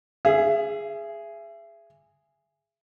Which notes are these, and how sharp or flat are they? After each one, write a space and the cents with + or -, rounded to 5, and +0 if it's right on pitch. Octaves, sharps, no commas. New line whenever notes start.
G#4 +0 E5 +30